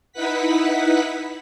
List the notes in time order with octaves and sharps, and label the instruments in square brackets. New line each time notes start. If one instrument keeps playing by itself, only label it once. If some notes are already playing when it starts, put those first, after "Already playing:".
[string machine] D#4 E4 B4 F#5 B6